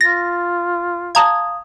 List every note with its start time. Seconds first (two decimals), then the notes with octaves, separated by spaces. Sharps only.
0.01 F4 A6 A#6
1.15 F5 A5 A#5 D#6 G#6